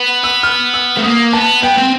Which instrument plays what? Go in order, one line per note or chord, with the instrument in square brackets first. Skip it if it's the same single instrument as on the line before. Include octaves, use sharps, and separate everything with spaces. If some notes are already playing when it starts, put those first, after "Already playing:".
Already playing: [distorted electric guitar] B3
[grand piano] E6
F6
E6
[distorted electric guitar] A3
[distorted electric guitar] A#3 [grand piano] D#6
[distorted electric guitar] B3 [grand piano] A5
[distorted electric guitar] B3 [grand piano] G5
[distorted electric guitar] C4